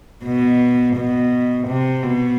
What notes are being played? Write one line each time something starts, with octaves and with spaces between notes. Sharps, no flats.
B2
B2
C3
B2